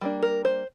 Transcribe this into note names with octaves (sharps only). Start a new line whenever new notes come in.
G3 A#3 D4
A#4
C5